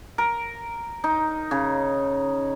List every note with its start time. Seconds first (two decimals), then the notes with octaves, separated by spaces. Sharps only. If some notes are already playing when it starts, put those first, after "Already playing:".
0.18 A#4
1.04 D#4
1.51 C#3